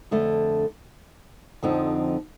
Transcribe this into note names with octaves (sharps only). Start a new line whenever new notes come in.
F2 D3 A3
F2 D3 F3 C4 D#4